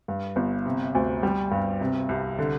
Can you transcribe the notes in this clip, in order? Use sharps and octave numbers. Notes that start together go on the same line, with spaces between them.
G2
G1
C3
D2
G3
G2
C3
C2
D3